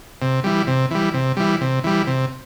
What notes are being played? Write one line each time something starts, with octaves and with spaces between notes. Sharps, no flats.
C3
E3 G3
C3
E3 G3
C3
E3 G3
C3
E3 G3
C3